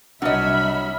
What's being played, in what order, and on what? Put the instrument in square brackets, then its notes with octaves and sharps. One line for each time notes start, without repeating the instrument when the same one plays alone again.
[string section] C2 E5 B5 [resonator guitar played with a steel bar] F#3 C#5 [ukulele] D4 D#5 [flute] F6